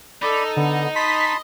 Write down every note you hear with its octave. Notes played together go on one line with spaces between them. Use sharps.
D#4 A4 D5 B5
D3 B3
D#5 A5 B5 C6 B6